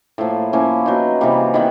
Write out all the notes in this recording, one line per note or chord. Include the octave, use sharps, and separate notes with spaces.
A2 F3 A#3
F3 A#3 C#4 E4
F#3 B3 D#4
C3 E3 G3 A#3
D#3 G3 B3 E4